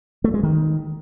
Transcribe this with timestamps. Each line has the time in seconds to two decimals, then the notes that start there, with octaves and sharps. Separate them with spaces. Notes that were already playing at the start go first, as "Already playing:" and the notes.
0.24 A3
0.34 G#3
0.43 D#3